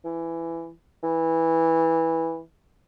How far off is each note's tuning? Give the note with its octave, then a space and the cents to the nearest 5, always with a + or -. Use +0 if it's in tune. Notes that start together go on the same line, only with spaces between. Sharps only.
E3 +15
E3 -10